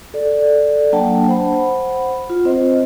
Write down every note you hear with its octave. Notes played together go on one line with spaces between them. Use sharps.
A4 D5
F#3 A#3 D4 F#5 G5 A5
C5 F#5 B5
F4
C4 C5 D#5